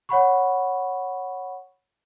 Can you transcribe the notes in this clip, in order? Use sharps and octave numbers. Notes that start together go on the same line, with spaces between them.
C#5 F#5 B5 C#6